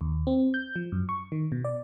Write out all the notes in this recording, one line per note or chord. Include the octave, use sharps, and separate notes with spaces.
D#2
C4
G6
F3
F#2
C#6
D#3
B2
D5